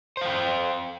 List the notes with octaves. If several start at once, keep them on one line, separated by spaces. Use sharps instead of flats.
C5 F5 G5